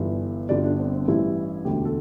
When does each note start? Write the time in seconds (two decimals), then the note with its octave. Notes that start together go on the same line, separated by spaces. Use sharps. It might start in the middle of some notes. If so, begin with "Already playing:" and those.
Already playing: G1 G2 E3 E5
0.49 G1 G2 D3 G3 D5
0.64 D4
0.75 D4
0.79 C4
0.93 C4
1.07 A1 G2 E3 G3 E4
1.65 E1 D2 D3 G4
1.85 A4